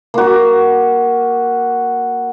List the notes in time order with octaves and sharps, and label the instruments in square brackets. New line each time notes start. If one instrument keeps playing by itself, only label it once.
[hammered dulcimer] A#3 F#4